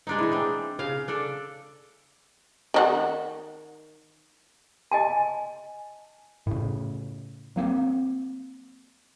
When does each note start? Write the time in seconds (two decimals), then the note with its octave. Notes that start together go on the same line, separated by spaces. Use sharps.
0.07 G#3 D4 D#4
0.19 E3 D#4
0.32 C4 D4
0.79 C#3 F5
1.08 D4 A4 D5
2.74 D#3 D4 F#5
4.92 D#5 G#5 A5
6.47 A2 C#3
7.56 F#3 A#3 C4